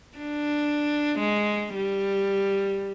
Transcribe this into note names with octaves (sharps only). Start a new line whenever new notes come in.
D4
G#3
G3